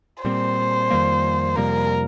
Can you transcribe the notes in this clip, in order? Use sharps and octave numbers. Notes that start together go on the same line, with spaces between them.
A#2 G3 C4 C5
F2 D#3 G3 A#3
F2 C3 G3 A#3 A#4